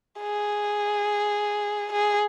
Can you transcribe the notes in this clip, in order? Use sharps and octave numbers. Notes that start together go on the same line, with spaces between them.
G#4
G#4